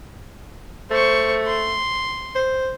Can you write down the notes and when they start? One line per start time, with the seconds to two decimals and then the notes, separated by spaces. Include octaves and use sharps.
0.91 A3 C5 C#6
1.47 C6
2.35 C5